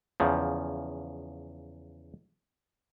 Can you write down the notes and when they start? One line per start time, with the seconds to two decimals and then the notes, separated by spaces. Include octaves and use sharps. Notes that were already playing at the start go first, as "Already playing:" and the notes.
0.20 E2 C#3 F3